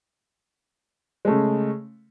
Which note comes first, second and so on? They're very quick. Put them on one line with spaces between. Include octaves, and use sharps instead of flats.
G#3 A3 C#3